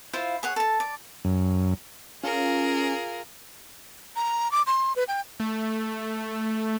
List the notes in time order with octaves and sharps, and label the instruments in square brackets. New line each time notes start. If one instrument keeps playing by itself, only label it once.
[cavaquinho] E4 F4 C5 F5
G#4 C#5 F#5
A4 A5
D5
[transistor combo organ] F#2
[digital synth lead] C#4 [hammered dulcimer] F4 [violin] G#4 A#4
[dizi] A#5
D6
C6
B4
G5
[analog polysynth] A3